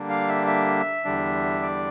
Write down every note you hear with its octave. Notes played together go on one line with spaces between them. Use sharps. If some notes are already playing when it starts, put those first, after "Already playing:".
Already playing: D3 G3 A#3 D4
F5
E5
E5
E2 D3 G3 D4
D5